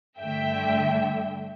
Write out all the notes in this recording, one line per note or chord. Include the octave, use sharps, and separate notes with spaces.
G2 D3 A3 E5 G5